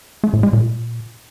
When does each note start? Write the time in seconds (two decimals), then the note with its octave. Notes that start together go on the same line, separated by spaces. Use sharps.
0.24 A3
0.33 A2
0.43 G#3
0.53 A#2